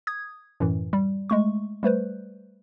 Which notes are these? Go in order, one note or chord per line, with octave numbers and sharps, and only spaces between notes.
D#6 G#6
F#2 A2 E3
G3
G#3 A3 C#6
G3 A3 B4 C5